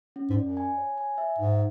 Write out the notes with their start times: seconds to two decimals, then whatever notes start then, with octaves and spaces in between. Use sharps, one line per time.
0.16 C#4
0.30 G#2
0.37 D5
0.43 F#2
0.57 G#5
0.78 C#5
0.98 G#5
1.18 E5
1.38 G#2 F#5